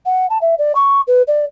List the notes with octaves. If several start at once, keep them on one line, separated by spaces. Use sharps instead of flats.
F#5
A5
E5
D5
C#6
B4
D5